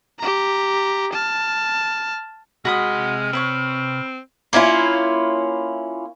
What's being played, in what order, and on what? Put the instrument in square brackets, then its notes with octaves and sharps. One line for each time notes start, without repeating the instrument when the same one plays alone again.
[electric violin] G4 A#5
A5 F6
[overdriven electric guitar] C3 C6 [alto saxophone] G#3 [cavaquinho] F#4 B5 D#6 [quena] F6
[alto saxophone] C4 [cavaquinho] B4 C#5 C#6
[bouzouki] A#3 C#4 E4 F4